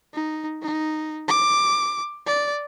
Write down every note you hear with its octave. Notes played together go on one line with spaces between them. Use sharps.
D#4
D#4
D6
D5